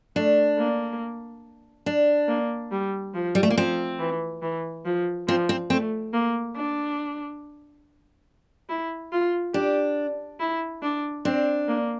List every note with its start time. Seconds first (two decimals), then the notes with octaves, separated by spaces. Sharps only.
0.16 A3 D4
0.59 A#3
1.86 D4
2.29 A#3
2.72 G3
3.14 F3
3.35 G3
3.43 A3
3.50 A#3
3.57 F3 C4
3.99 E3
4.42 E3
4.86 F3
5.28 F3 C4
5.49 C4
5.70 A3 C4
6.13 A#3
6.56 D4
8.69 E4
9.12 F4
9.54 D4 G4
10.40 E4
10.83 D4
11.25 C4 D4
11.68 A#3